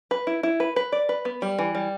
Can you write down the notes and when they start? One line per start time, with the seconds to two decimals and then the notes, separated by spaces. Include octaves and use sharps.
0.11 B4
0.27 E4
0.43 E4
0.60 B4
0.76 B4
0.92 D5
1.09 B4
1.25 B3
1.42 G3
1.59 E3
1.75 G3